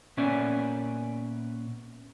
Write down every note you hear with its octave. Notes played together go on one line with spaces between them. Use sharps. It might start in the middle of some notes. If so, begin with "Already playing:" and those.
A#2 B3 C#4 D5 E5 G#5